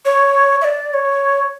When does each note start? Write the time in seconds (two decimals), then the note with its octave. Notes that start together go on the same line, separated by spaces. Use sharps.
0.05 C#5
0.61 E5
0.65 D5
0.90 D5
0.94 C#5